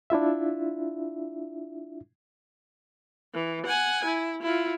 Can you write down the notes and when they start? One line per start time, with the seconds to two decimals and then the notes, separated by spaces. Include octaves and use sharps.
0.10 D4 E4 F4 E5
3.34 E3
3.67 F#5 G#5
4.05 E4
4.42 E4 F4